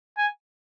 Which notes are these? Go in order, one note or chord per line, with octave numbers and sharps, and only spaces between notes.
G#5